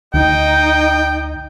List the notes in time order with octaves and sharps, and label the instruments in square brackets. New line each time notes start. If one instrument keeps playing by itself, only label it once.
[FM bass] D2 [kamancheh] D#4 D#5 [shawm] G5